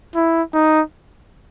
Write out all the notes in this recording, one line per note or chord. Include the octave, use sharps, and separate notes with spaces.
E4
D#4